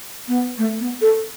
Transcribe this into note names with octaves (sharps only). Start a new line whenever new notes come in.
B3
A3
B3
A4